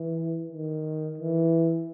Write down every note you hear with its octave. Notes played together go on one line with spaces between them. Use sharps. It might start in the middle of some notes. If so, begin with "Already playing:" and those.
Already playing: E3
D#3
E3